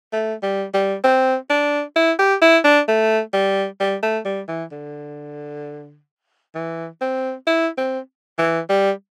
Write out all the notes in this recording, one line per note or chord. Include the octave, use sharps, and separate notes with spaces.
A3
G3
G3
C4
D4
E4
G4
E4
D4
A3
G3
G3
A3
G3
E3
D3
E3
C4
E4
C4
E3
G3